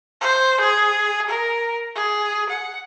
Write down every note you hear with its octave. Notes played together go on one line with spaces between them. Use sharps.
C5
G#4
A#4
G#4
F#5